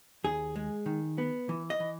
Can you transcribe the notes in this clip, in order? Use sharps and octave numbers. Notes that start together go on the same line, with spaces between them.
D#2 G#4
G#3
D#3
B3
E3
D#5
E3